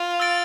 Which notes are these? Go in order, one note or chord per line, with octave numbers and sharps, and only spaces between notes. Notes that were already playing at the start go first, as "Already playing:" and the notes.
Already playing: F4
E6 A6 D7